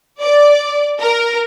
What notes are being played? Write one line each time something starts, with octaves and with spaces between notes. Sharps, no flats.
D5
A#4